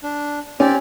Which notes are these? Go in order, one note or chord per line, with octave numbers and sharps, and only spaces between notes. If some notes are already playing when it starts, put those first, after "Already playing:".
D4
C4 C#4 G4 D5